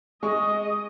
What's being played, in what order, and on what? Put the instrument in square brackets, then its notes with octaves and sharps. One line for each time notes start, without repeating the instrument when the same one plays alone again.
[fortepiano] G#3 C#6 [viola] D#5